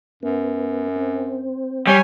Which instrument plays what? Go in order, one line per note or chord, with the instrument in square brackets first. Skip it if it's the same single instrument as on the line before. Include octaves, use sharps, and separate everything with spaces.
[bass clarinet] F#2 [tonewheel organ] B3
[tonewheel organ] C4
[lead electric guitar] G3 [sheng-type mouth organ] C#5 G#5